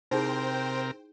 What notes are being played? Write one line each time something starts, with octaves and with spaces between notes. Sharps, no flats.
C3 D#4 E4 G#4 A#4 C5 G5